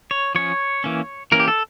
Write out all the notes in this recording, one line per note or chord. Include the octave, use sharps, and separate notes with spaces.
C#5
F3 C#4 C#5
E3 A#3 C#4
E3 A#3 C#4 A#4
G4
A4